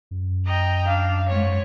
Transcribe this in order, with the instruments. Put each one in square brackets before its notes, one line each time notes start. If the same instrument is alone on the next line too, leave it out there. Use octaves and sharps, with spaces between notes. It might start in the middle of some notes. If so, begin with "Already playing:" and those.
[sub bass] F#2
[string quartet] D#5 G5 A#5
[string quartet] D4 [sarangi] F5
[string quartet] G#2 [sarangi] C#5